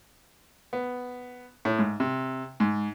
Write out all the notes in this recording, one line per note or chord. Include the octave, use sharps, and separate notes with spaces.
B3
A2
G#2
C3
G#2